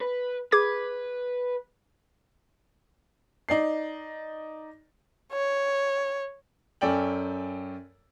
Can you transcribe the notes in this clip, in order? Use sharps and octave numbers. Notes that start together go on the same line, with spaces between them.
B4
G#4 B4 D6 G#6
D#4 D5 C7
C#5
F#2 C#4 A4 D5 G5 F#7